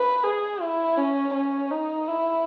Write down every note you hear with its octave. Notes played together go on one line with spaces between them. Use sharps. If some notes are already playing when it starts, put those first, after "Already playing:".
Already playing: B4
G#4
E4
C#4
C#4
D#4
E4